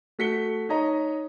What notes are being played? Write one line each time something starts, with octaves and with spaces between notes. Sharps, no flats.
A3 F#4 B6 C#7 G7
D#4 C#5 D#5 A#5